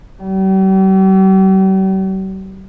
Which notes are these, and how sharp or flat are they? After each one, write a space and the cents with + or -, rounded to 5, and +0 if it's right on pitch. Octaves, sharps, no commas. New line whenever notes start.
G3 -45